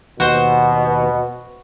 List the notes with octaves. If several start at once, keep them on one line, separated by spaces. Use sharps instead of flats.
D#2 B2 B3 F#4 C5